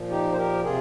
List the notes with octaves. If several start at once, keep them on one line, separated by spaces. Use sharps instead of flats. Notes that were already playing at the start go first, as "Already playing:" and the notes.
Already playing: A#2 F3
D#4 G4
C5
G4 A#4
C3 F4 G#4